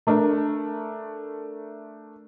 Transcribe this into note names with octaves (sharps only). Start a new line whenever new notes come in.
A3 D4 A#4